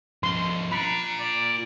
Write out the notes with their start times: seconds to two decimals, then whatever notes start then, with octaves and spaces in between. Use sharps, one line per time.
0.23 F3 C#4 C6
0.72 D4 F4 A#5 B5
1.20 D5